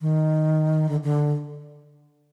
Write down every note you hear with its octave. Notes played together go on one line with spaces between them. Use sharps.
D#3
D3
D3